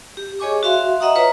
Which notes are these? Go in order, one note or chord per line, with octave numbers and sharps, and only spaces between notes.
G4
G#4 C#5 D#5 G#5 C#6 D6
F#4 E5 F5 C6
D#5 E5 F#5 A#5 D#6
F4 B4 C#5 A#5